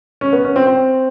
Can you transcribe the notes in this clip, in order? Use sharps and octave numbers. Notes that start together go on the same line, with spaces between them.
C#4
B3
C#4
C4
C4